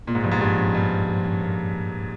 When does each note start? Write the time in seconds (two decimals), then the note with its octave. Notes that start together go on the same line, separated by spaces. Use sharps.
0.07 A#2 G#3
0.15 G#2
0.24 G2 F3
0.32 G#2
0.40 G2 G#4
0.57 C#4
0.74 G2 G#3
0.91 F3
1.07 G#4
1.25 C#4
1.42 A#3